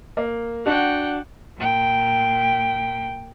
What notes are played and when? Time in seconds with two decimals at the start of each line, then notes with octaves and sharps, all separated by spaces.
0.17 A#3
0.66 D4 F#4 F#5 G5
1.58 A#2 G5